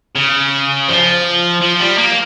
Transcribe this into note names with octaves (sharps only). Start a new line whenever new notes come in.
C#3
F3
F3
G3
A#3